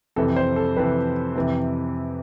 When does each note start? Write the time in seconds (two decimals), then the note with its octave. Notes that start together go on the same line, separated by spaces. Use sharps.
0.16 F2 C3 E3 A4
0.36 C5
0.56 A4
0.77 F2 C3 E3 B4
1.35 F2 C3 E3